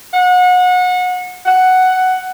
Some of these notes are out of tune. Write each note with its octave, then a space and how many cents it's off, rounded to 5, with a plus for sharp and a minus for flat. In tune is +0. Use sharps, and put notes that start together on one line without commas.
F#5 -30
F#5 +5